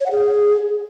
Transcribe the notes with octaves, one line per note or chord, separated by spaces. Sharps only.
C#5
F#5
G#4